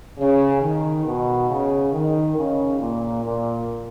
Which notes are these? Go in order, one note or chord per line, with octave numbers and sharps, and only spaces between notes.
C#3
D#3
B2
C#3
D#3
C#3
A#2
A#2